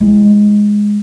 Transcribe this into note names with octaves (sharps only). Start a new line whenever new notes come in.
G#3 E4